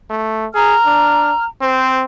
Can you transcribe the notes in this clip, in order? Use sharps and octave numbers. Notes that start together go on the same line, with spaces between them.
A3
G#4 A#5 F6
D4
C4 C5